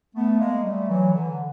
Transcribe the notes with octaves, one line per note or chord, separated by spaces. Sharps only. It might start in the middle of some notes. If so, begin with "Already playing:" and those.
A3 B3
G#3 A#3
G3 A3
E3 F#3
D3 E3